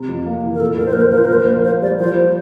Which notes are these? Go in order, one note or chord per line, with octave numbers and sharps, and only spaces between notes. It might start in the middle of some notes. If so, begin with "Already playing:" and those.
Already playing: C3
F2
A#3
E3
A#4
A#2 A4
A#1 A#4
C5
A#1 A#4
C5
A#4
F3
C5
A#4
A#2 C5
A#4
A#1
A#3 C5
G3 D5
F3 C5